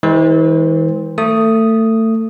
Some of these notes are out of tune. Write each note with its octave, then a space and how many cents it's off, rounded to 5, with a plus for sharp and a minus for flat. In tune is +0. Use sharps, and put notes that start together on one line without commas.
E3 -45 G#3 -20 C5 +0
A3 +25 D#6 +0